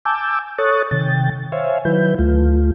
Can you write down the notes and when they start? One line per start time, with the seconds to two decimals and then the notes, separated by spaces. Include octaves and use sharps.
0.05 G#5 A5 D6 E6 G6
0.58 A4 C#5 C#6 D#6 F#6 A6
0.91 C3 D#3 G5 A6
1.52 C5 C#5 E5 F5 G#5
1.85 D#3 F#3 E4 B4 G6
2.19 D2 A3 F4